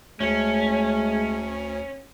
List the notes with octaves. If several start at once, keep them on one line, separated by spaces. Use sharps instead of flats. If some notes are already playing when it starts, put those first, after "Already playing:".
D2 G#3 A3 C#4